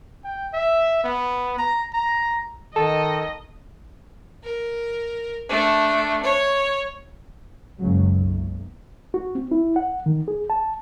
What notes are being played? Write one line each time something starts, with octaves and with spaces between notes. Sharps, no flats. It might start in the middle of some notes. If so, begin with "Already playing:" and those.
G5
E5
B3
A#5
A#5
D#3 A4 D#5 A5
A#4
A3 D4
C#5
F#1 C#2 C#3 F#3
B1
F#4
C4
E4
F#5
D#3
G#4
A5